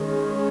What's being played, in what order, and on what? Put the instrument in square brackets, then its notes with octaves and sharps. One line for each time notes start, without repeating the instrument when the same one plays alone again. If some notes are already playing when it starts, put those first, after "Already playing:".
Already playing: [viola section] D#3 G#3 C#4